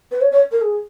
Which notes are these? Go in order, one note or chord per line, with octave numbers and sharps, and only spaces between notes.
B4
C#5
C#5
A#4
G#4